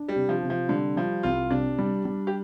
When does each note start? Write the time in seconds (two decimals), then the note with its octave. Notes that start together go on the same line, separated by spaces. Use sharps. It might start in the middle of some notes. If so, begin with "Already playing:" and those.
Already playing: D4
0.08 G3
0.16 C3
0.29 F3
0.43 C3
0.50 F3
0.69 D3 G3
0.96 F3 G3
1.23 C2 F4
1.50 C3 D4
1.78 G3
2.05 G3
2.27 G4